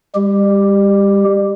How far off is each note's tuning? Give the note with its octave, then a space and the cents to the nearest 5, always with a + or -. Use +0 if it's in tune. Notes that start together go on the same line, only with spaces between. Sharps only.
G3 +35 G4 +0